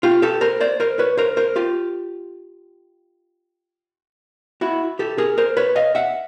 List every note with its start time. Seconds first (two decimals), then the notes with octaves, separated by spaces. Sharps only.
0.03 F4 G4
0.22 G4 A4
0.41 A#4 C5
0.60 C5 D5
0.80 A#4 C5
0.99 B4 C#5
1.17 A#4 C5
1.37 A#4 C5
1.56 F4 G4
4.61 E4 F#4
4.99 G4 A4
5.18 G#4 A#4
5.38 A#4 C5
5.57 B4 C#5
5.76 D#5 F5
5.95 E5 F#5